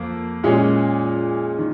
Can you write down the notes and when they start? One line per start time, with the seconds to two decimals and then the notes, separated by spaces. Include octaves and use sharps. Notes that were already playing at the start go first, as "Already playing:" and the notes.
Already playing: F2 A#3
0.43 A#2 G#3 C#4
1.58 D#3